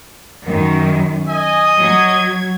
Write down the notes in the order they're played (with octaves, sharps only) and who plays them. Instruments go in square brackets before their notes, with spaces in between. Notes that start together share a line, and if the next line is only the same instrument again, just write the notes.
[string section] F#2 D#3
[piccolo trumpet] D#5 [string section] G#5
[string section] F#3 G#6